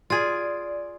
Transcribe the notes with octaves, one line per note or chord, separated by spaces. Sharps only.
F4 G#4 D5